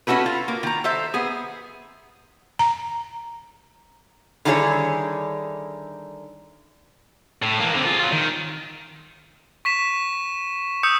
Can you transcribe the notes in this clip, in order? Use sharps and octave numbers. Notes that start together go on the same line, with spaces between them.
C#4 E4 F#4 A4 B4
F4
A#3
D#3 A#5
A4 C5 E5
B3 G#4
A#5
D3 D#3 G3 E4 G#4 C#5
A2
E3 A#3
D3 C4
F4 G#4
F#3 F4
D#3
C#6 B6 E7
D#6 E6 G6 C#7